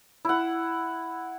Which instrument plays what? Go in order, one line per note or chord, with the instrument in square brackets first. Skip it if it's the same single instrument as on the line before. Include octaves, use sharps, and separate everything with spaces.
[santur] E4 F#5